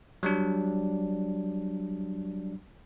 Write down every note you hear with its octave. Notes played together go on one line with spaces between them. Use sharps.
F#3 G3 D4